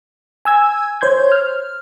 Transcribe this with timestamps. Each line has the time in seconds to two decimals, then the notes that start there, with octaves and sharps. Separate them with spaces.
0.45 G#5 E6 G#6
1.01 C5 C#5 C6 G6 G#6
1.32 F6